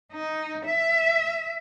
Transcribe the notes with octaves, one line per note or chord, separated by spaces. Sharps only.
D#4
E5